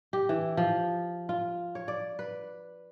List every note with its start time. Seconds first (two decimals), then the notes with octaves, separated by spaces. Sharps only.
0.13 G4
0.29 E3
0.57 F3
1.29 F4
1.75 C#5
1.88 D5
2.19 B4